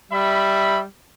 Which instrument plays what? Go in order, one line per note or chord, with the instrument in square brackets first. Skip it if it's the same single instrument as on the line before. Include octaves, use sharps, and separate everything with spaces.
[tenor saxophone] G3 [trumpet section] E5 B5